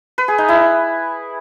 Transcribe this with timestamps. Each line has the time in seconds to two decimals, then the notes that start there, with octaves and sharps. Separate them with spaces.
0.18 B4
0.28 G#4
0.38 D#4
0.49 E4